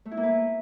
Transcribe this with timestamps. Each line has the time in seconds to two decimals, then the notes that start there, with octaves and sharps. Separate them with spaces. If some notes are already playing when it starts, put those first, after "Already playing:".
0.05 A3
0.11 E4
0.17 A#3
0.23 B4